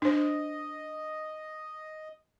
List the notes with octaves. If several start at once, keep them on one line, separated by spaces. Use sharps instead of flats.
D4 C5 D#5